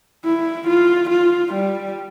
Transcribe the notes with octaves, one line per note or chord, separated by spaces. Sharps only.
E4
F4
F4
G3